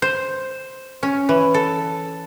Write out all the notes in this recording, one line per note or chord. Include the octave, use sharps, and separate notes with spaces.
C5
C#4
E3
A4